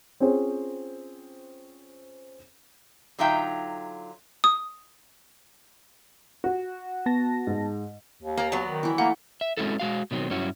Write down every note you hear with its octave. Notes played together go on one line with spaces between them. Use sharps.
C4 C#4 F4 G#4 C5
D3 F#3 D#4 F4 E5 G5
D#6
F#4
B3 A5 A#6
G#2
D#2
A#3 D5 A#5
F#3 B3
D#3
E3 E4
A3 A#3 F#5
E5
G#3 C4 C#4 E4 F#4 A4
G#3 F#4 F5
B2 D#3 F#3 A#3 C4
G2 F#3 C#4 E4 F#4